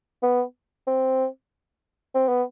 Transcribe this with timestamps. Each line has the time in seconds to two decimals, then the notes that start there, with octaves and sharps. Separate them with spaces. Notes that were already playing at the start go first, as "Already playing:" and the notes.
0.22 B3
0.87 C4
2.14 C4
2.28 B3